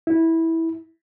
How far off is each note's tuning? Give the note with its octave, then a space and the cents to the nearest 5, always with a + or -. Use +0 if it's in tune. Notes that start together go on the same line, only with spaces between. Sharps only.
E4 -15